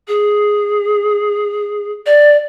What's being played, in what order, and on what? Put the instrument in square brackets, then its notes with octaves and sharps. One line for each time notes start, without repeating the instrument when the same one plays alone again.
[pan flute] G#4
D5